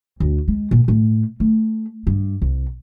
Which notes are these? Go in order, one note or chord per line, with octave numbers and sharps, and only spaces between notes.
D2
G#3
A#2
A2
A3
G2
C2